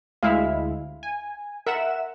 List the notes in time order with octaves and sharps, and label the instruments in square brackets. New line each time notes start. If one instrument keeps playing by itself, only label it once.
[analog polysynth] D2 G#3 E4 [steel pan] E5 F5
[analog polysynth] G#5
[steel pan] A#4 [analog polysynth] E5 F#5 E7